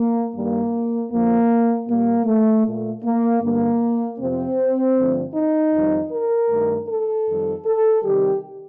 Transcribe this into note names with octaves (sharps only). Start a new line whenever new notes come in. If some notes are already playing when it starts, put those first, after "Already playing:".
Already playing: A#3
G2 D#3 G3 A#3
F2 D3 F3 A#3
A#2 G3 A#3
A3
A#2 A3
A#3
G2 D3 G3 A#3
F2 C3 F3 C4
G2 D3 F3 A3
D#4
F2 D#3 G3
A#4
G2 D#3 A3
A4
F2 D#3 G3
A4
C3 D#3 G3 G4